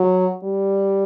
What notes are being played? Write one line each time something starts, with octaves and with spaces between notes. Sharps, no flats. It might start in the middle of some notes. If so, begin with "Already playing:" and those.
Already playing: F#3
G3